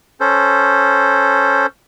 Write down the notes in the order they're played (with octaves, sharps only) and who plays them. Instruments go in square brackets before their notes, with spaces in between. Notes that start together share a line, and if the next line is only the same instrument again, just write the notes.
[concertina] C#4 A4 C5